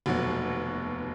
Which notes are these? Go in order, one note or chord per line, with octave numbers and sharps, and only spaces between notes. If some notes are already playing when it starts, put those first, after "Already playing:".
F1 D#2 B2 F#3 F#4